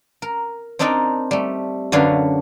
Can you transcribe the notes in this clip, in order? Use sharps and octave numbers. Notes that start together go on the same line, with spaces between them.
A#4
C4 D4 D#4 A#4 D5
G3 A3
F#2 D3 D4 B4 C#5 F5